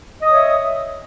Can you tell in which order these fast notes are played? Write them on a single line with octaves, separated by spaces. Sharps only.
D#5 D#6 C#5 E5